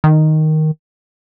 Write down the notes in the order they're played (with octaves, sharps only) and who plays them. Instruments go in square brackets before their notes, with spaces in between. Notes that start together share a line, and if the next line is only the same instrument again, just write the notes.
[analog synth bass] D#3